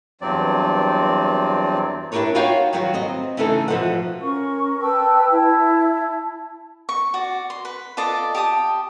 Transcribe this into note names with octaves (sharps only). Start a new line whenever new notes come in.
E2 G2 F#3 C4 D5
D4 E4 G4 A#4 B4 C#5
D#4 F4 F#4 C#5 F5 G5
D#3 F#3 G3 F#4 B4 F5
C4 D#5
C#3 E3 A3 D#4 E4 A4
B2 E3 F3 A3 C5 F#5
C#4 A#4 C#6
B4 G5 A5 E6
E4 A5
C#6
F#4 D5
C6
B4
F4 A4 D5 D#5
G4 A5 D#6